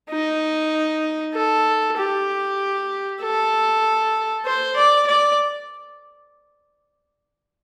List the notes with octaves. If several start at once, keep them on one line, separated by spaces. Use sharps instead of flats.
D#4
A4
G4
A4
C5
D5
D5